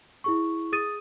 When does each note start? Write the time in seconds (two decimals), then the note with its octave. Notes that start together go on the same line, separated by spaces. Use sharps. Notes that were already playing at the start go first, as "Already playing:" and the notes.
0.24 E4 G#4 C#6
0.72 G#4 D#6 A6 D#7